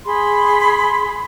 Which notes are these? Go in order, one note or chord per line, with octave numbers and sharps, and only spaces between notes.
G#4 B5 C6